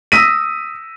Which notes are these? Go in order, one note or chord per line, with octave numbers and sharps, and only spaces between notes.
D#6 E6 A#6 B6 D#7